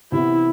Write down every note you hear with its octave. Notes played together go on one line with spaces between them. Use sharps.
C3 E3 B3 E4